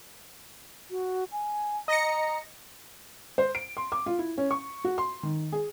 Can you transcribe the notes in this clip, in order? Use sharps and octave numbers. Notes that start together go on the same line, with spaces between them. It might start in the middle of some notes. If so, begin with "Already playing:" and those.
F#4
G#5
D#5 A#5 A#6 C#7
C5
D7
C6
D6
F4
E4
C#4
C#6
F#4
C6
D#3
G#4